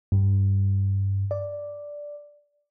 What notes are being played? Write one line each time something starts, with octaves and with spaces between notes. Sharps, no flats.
G2
D5